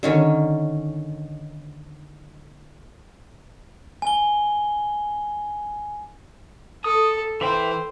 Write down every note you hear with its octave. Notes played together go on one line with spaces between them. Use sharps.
D3 D#3 C#4
G#5 G7
A4 D#6
E3 C5 E5 G5